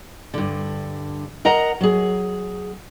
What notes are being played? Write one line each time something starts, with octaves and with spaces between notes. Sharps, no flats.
G2 D3
A#4 D#5 F#5 A#5
F#3 G#4